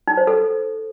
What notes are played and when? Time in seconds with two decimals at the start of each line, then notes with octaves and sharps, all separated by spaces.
0.07 D#4
0.17 C5
0.27 A4